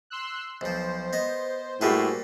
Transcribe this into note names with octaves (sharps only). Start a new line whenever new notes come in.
C6 E6 F#6
B1 F3 C5
B3 D#5
A2 G3 A#3 F#4 G#4 B4